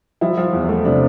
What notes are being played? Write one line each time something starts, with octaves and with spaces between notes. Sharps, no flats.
F3 E4
F3
E2
A3
C3 D4